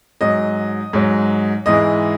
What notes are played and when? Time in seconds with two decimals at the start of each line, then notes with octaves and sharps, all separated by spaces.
0.21 G#2 F#3 D#5
0.93 G#2 F#3
1.66 G#2 E3 G#3 D#5